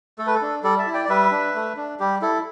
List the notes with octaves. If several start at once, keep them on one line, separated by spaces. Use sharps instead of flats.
A3 A4
B4
A4
D4
G3 A4 D5
E5 A5
E4
D5 G5
D5
G3 B4 E5
D4
A3
D4
G3 G4
E4 A4